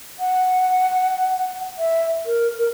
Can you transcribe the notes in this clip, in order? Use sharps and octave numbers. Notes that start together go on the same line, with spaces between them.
F#5
E5
A#4
A#4